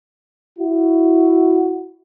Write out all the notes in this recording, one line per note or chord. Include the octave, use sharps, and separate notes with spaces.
E4 F#4